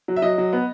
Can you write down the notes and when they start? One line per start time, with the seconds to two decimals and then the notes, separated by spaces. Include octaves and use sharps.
0.08 F#3
0.16 E5
0.22 F#3 D#5
0.38 F#3
0.53 B3